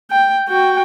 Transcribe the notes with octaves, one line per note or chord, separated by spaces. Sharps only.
G5
F#4 G5